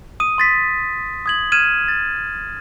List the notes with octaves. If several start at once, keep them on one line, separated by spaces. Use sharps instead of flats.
D#6 D#7
C6 A6 B6
D#6 G#6 F#7
F6 G#6 D#7 E7
A6